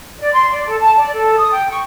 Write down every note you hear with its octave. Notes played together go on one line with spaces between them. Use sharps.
D5
C6
D5
A4
A5
D5
A4
D#6
G5
C#6